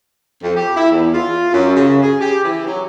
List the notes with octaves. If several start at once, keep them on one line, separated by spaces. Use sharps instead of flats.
F2
G4
E4
E2
F4
F#2
C#3
G#4
G4
E3
F#3